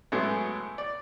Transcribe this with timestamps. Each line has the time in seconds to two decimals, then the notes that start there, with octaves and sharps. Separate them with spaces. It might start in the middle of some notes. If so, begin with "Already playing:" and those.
0.12 A2 F#3 G#3 A3 B3
0.78 D5